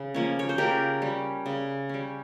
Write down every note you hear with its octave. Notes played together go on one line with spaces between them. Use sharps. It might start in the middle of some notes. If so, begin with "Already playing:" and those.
Already playing: C#3
F3 A#3 C#4
C#5
C5
C#3 G4 A#4
G3 C#4
C#3
G3 C#4